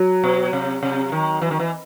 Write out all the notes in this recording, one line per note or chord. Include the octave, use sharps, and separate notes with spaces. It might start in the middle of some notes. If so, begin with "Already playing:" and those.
Already playing: F#3
B2
C3
C3
D#3
E3
D#3
E3